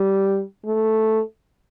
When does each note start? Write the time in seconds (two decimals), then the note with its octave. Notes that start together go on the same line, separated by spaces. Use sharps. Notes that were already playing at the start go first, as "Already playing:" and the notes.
Already playing: G3
0.65 A3